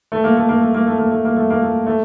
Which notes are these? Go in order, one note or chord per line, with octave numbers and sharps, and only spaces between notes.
A3
A#3
A3
A#3
A3
A#3
A3
A#3
A3
A#3
A3
A#3
A3
A3